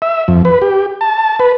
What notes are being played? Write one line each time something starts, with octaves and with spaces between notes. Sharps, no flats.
E5
F2
B4
G4
A5
B4